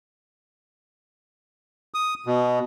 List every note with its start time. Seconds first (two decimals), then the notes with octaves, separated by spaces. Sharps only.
1.94 D#6
2.26 B2